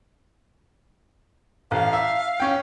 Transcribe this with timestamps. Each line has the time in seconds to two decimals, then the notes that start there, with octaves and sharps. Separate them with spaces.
1.71 A1 F5
1.93 E5
2.40 C#4 G5